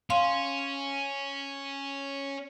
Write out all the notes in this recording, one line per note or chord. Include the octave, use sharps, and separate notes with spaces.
C#4 F5 C6